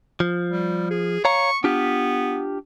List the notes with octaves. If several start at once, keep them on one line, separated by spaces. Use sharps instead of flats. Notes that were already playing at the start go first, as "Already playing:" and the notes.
F3
G3
G#4
C#5 F5 A#5 C#6
B3 D4 F4 G4